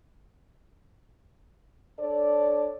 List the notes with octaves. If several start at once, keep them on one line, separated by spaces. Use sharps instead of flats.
D4 A4 C#5 D5